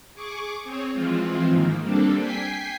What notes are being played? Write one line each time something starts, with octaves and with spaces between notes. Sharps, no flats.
G#4 C#6 D6
C4 G#4 C#5
E3 F3 G#3 C4 F4
G#2 D#3 A#3
G3 A#3 C4 D4 A4
G5 G#5 B6 C7